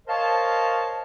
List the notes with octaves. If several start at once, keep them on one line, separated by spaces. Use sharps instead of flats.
A#4 C5 C#5 D#5 F5 A5